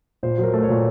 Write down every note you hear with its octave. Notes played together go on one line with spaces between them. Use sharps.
A#2 C5
F#3
A#4
A3
C#5
A#2